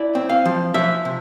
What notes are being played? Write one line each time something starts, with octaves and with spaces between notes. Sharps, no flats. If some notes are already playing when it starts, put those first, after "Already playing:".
Already playing: E4 D5
C4
F5
F3
F3 E5
C3